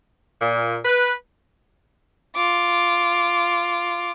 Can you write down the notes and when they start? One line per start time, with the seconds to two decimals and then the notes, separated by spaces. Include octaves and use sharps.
0.42 A#2
0.85 B4
2.35 F4 D6